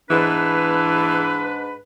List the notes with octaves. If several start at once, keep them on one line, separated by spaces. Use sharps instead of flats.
G#2 E3 D4 B4